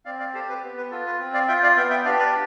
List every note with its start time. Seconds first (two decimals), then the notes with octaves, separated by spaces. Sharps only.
0.05 C4 D5 F5
0.20 D5 F5
0.34 G4 A4 C5
0.49 B4
0.63 B3
0.77 B4
0.91 F4 A4
1.06 B4
1.20 C4
1.34 D5 F5
1.48 F4 E5 G5
1.63 D5 F5
1.77 B3 E5 G5
1.90 E5 G5
2.05 D4 G4 D5 F5
2.19 B4 D5